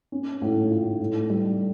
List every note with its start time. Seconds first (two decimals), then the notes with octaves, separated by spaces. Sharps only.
0.12 C#4
0.42 A2
0.71 F4
1.00 A2
1.30 G3